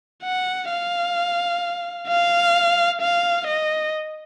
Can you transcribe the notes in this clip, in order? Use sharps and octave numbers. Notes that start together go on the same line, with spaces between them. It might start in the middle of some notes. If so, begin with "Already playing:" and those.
F#5
F5
F5
F5
D#5